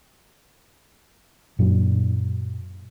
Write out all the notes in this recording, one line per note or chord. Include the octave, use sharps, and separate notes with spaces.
F#2 A#2 F#3 D4